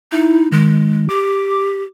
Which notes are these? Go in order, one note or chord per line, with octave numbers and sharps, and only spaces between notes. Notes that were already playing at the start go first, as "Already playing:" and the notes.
D#4 E4
D#3 G#3
G4 D6